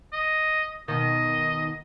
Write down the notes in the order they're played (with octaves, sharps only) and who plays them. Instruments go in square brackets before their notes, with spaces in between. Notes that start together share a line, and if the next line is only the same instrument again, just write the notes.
[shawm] D#5
[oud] B2 D#3 [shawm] D#5